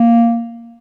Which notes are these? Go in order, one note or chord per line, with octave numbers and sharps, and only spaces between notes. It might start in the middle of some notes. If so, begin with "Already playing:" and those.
Already playing: A#3